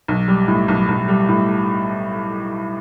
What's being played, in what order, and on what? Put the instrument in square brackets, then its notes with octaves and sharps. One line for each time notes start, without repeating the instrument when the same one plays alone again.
[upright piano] B1
G3
A2
B1
B1
G3
A2